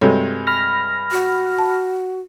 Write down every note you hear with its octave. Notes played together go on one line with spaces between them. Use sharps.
G2 C3 G#3 F#4 A4 C#5
B5 F6 A#6
F#4
A5